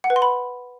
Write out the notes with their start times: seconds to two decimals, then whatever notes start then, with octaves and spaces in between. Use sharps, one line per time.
0.04 F#5
0.10 B4
0.16 C6
0.22 B5